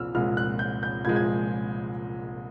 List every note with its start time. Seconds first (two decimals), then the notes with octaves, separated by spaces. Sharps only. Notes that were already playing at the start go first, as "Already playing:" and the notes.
Already playing: C2 A#2 F3 E6 F6
0.15 C2 A#2 F3 G#3 F6
0.37 F#6
0.59 G6
0.83 G6
1.04 C2 A#2 F3 G#3 G#6
1.16 G#6